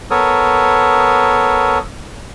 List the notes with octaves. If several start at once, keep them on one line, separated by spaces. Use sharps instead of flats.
B3 A4 A#4 C#5 D#6